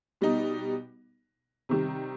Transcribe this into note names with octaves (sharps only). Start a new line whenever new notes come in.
B2 G3 B3 D#4
C3 D#3 G3